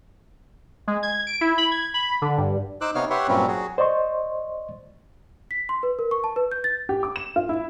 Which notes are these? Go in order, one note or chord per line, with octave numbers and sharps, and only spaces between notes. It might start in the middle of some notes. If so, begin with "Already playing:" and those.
G#3
G#6
D7
E4
B5
G#6
B5
D3
G2
D#4 C5 D6 E6 F#6
C3 B3 D#4 C#5 F5 F6
G4 B4 C#5 E5 F#5 C6
G2 A#2 F#3 G3 C4 C#4
F#3 F#4 G#4
C5 D5 D#5 C6 C#6
B6
C6
B4
A#4
C#6
A5
B4
G6
A6
G4
D6
E7
F4
E4